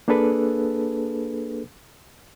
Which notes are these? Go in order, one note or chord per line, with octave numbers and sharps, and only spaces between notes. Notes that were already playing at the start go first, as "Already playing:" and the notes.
A#3 D4 G#4 A4 B4